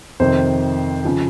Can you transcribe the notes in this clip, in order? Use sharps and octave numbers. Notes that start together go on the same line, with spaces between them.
F2 C3 D#3 C5
C#3 F3